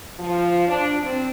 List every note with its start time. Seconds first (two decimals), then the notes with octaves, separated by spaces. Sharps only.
0.19 F3
0.66 D4
1.02 C4